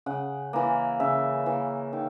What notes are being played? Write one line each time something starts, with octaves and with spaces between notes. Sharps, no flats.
C#3 F#5
E3 A#3
C#3 E5
E3 A#3
D#3